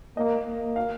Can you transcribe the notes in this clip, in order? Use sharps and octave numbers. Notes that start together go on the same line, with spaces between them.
A#3 D#5
A#3
F5